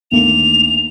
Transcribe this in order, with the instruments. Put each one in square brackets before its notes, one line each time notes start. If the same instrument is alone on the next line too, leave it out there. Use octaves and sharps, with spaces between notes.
[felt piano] D2 D#3 A#3 [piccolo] F7